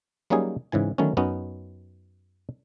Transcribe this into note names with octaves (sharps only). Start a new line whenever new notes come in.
F#3 G3 A#3 C#4 D#4 G#4
G#2 C#3 E3 G#5
D3 D#3 F#3 A3 B3 C#4
F#2 B3 C#4 D#4 F#4